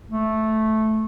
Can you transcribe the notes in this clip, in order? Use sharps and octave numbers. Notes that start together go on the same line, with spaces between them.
A3